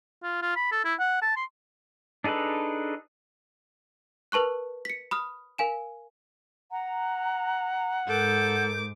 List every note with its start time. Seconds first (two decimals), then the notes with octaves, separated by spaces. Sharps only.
0.23 F4
0.42 F4
0.56 B5
0.72 A4
0.85 E4
1.00 F#5
1.22 A5
1.36 C6
2.24 D4 D#4 G#4 A4 B4
4.32 A#4 B4 A5 C#6 F#6
4.85 B6 C#7
5.11 B5 D#6 F6
5.58 A#4 F5 G#5 E7
6.71 F#5 A#5
8.07 G#2 A4 A#4 D6 G6